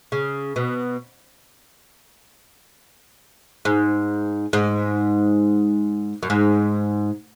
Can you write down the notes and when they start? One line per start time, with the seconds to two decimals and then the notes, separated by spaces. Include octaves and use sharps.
0.12 C#3
0.56 B2
3.65 G#2
4.53 G#2
6.23 F#2
6.30 G#2